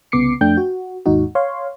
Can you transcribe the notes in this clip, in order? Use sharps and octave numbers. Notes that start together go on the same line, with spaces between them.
C2 C#3 B3 D6 C7 C#7
F2 A3 D4 G5 G6
F#4
G#1 D#2 G#2 D#4 F#4
C#5 F5 C6